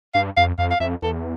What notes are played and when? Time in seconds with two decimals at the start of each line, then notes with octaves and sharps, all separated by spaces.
0.14 G2 F5
0.37 F2 F5
0.58 F2 F5
0.71 F5
0.80 F2 E5
1.02 E2 A4